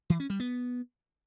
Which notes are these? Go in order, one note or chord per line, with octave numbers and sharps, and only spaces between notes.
E3
C#4
G3
B3